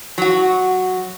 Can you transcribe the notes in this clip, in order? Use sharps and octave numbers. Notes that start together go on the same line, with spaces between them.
F#3 F#4